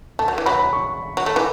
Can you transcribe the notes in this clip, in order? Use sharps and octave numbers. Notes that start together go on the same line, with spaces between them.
A3 A5
F#3
E3
F#3 B5
B5
C#6
F#3
A3
E3